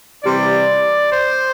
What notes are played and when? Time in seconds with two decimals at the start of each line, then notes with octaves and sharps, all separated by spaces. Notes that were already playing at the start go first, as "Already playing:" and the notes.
0.24 C3 E3 G3 D5
1.12 C5